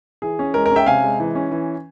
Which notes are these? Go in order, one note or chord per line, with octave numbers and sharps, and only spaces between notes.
E3 G#4
C#4
G#3 A#4
A#4
C#4
E5 G5
C3 F5 G#5
G#3
E3
C#4
E3